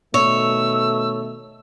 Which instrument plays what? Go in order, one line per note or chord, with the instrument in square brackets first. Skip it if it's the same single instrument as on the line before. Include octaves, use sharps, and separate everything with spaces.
[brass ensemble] B2 D#3 A3 [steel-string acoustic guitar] C#5 [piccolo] E6